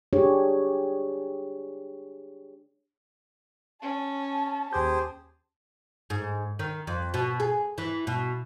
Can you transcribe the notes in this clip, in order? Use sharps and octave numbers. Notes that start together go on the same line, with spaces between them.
D4 G4 G#4 C#5
C#4 A5
D#2 G4 G#4 C5 G6
G#2
D#3
F2
B2
G#4
E3
B2